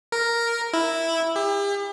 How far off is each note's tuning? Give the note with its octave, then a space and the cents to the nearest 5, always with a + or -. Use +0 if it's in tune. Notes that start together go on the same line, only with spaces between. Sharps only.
A#4 +0
E4 -5
G4 +40